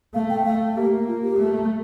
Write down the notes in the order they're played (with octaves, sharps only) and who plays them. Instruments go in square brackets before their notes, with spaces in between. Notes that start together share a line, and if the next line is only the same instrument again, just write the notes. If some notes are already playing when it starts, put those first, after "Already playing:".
[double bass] A3 [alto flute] F5
[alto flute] G5
[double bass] A3 [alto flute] F5
[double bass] A#3 [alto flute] G4
[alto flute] F4
G4
[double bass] A3